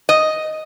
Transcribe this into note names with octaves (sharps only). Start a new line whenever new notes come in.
D#5